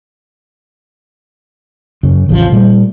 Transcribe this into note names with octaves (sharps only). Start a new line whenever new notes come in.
F#2 C#3
A1 C#3 E3 F3
A#2 G3 A3